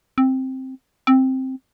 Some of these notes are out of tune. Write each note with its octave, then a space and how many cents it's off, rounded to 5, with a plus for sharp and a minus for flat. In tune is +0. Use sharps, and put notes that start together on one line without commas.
C4 +5
C4 +5